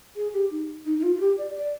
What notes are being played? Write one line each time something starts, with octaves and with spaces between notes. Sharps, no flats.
G#4
G4
D#4
D#4
D#4
F4
F4
G4
D5
D5